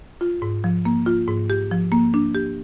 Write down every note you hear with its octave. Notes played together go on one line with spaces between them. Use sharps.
F4
G#2
F3
A#3
F4
G#2
G4
F3
A#3
D4
G4